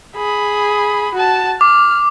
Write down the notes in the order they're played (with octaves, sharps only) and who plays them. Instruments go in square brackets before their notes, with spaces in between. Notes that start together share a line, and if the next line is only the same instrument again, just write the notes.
[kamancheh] G#4 B5
F#4 A5
[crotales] D6 [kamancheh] F6